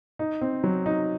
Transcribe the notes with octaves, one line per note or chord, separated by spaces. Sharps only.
D#4
C4
F#3
D#4